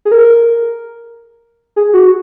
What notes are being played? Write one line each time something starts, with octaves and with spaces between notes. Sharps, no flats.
G#4
A#4
G#4
F#4